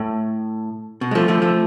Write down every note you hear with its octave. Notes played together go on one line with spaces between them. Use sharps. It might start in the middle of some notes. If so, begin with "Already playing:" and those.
Already playing: A2
B2
G#3
F3 A3
F3 A3
F3 A3